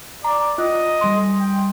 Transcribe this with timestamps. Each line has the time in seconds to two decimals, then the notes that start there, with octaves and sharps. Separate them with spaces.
0.24 D5 A#5
0.58 F4 D#5
1.01 G3 C6
1.40 G5